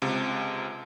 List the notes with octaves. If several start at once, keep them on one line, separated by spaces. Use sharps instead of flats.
C#2 C3